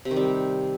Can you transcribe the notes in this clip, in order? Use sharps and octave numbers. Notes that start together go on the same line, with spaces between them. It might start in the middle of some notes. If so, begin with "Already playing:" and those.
C3
D#3
G3